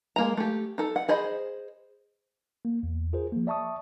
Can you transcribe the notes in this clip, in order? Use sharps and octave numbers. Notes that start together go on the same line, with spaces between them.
G#3 A#3 A#5
A3 G4
D#4 A4
F#5
G#4 C5 D#5 B5
A#3
E2
F4 G#4 A#4 C5
F3 A#3
D5 E5 A5 C#6 D#6